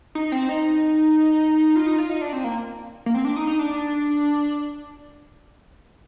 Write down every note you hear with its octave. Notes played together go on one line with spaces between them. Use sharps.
D#4
C4
D#4
F4
D#4
F4
D#4
D4
C4
A#3
A#3
C4
D4
D#4
D#4
D4